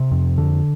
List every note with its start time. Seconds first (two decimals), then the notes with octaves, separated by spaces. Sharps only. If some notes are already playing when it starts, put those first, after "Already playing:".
Already playing: C3
0.12 F2
0.38 D3